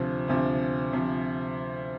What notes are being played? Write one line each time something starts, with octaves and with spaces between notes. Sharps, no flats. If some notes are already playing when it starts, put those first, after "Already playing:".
Already playing: D2 C3 F3
D2 C3 F3
C3 F3